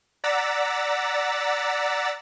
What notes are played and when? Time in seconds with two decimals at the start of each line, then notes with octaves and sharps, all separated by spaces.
0.24 D5 F#5 A#5 E6 A6 B6